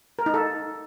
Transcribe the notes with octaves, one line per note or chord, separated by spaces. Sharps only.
A#4
D#4
A4